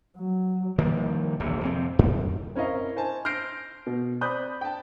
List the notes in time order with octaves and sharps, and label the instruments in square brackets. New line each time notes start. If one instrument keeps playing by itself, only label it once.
[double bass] F#3
[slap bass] D#3 F3 G3 A#3
D1 A#1 E2
F2 C3 C4
F#2
[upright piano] C4 C#4 E4 A#4 D#5 F5
C5 G#5 A5
C6 F6 G6 A#6 C7 D7
B2
C4 D5 B5 D#6 F#6 G6
G5 A5